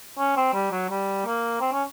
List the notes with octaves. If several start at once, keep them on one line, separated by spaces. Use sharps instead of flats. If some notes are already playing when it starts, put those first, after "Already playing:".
C#4
C4
G3
F#3
G3
A#3
C4
C#4